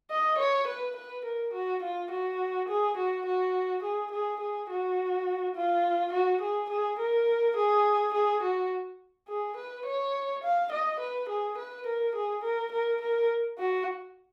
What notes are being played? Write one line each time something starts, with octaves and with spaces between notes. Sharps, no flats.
D#5
C#5
B4
B4
A#4
F#4
F4
F#4
G#4
F#4
F#4
G#4
G#4
G#4
F#4
F4
F#4
G#4
G#4
A#4
G#4
G#4
F#4
G#4
B4
C#5
F5
D#5
B4
G#4
B4
A#4
G#4
A#4
A#4
A#4
F#4